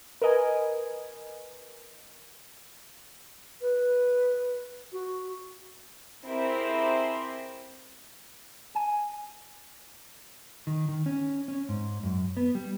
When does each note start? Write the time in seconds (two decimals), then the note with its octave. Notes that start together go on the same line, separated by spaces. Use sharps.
0.22 A#4 B4 D#5 G#5
3.61 B4
4.93 F#4
6.25 C4 E4 G4 G#4 A#4 C5
8.75 G#5
10.67 D#3
10.89 D#3
11.06 C#4
11.48 C#4
11.69 G#2
12.03 F#2
12.37 B3
12.55 G3